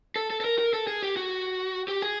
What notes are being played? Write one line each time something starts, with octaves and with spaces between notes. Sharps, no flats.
A4
A4
A4
A#4
A#4
A4
G#4
G4
F#4
G4
G#4